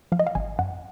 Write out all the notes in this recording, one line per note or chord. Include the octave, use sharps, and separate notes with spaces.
F3 F5
D#5
F5
G#1 G#5
F#2 F#5